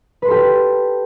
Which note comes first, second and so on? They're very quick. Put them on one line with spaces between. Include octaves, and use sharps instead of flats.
B4 C6 A4 G4